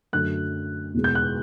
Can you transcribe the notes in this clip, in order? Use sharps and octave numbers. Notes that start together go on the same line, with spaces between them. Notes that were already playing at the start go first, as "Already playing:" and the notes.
F#2 D3 F#3 A3 F#6
E2 B2 G#3
G6
F#6